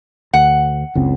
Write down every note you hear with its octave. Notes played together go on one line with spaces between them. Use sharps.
D2 F#5
F#1 C#2 C4